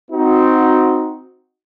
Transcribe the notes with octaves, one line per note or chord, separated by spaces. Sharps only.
C4 D#4 F#4